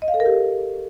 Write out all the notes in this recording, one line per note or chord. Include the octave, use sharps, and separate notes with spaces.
D#5
F5
A4
A#4
G4